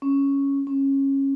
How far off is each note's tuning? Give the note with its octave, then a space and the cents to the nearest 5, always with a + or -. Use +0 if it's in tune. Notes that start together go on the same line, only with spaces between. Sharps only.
C#4 +0
C#4 -20